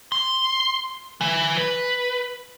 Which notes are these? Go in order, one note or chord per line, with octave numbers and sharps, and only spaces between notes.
C6
E3
B4